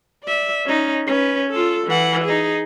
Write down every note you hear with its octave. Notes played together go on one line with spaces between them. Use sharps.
D5 E5
C#4 D#4
C#4 B4
F4 A4
E3 F#5
D#4 G#4